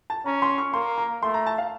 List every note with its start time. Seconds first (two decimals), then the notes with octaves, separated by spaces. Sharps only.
0.10 A5
0.26 C#4 A#5
0.42 C6
0.58 C#6
0.73 A#3 C6
0.98 A#5
1.23 A3 C6
1.34 A#5
1.46 A5
1.58 F5